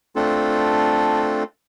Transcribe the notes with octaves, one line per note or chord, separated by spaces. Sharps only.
A3 C4 D4 F4 A4